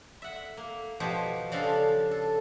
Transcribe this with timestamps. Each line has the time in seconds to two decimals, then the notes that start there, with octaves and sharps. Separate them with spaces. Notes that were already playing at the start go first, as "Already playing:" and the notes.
0.22 E5 F#5
0.57 A#3
1.00 B2 F3 G4
1.52 C#3 F3 D4 A4 F5
2.11 A4